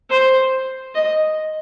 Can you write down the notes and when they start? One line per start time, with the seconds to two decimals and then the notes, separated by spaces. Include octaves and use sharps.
0.10 C5
0.95 D#5